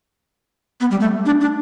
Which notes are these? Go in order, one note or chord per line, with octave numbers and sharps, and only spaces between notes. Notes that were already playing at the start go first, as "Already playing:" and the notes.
B3
G3
A3
D4
D4